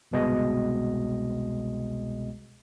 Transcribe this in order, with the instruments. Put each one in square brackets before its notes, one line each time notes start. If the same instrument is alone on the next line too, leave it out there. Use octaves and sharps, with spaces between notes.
[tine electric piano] G1 C2 B2 G#3 D#5